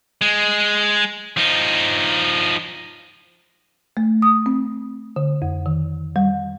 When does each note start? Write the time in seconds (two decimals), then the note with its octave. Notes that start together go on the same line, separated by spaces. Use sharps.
0.21 G#3
1.37 F3 D#4
3.97 A3
4.22 D#6
4.46 C4
5.16 D3
5.42 F2
5.66 D#3
6.16 G3